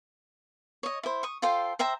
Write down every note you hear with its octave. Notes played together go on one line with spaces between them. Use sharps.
C#5 D#5
E4 C5
C#6 D#6
F4 A4 C5 G5
C5 E5 G5 A#5